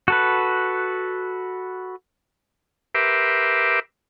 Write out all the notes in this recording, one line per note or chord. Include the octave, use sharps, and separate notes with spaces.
F#4 A4 B4
G4 A#4 B4 E5 C6 D6